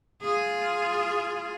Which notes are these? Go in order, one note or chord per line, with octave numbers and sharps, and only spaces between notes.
F4 G#4